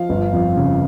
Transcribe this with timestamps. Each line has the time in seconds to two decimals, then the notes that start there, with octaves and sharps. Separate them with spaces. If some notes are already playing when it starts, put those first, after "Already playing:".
Already playing: F3 F5
0.09 G1
0.32 F2
0.56 C#3